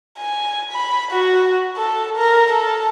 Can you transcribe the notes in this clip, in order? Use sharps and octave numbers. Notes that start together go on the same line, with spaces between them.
G#5
B5
F#4
A4
A#4
A4